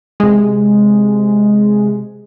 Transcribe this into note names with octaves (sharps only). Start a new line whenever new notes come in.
C3 G#3